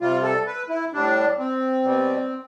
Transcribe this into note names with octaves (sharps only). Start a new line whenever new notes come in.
C3 G3 F4
A4
B4
E4
A2 G3 D4
C4
B2 G3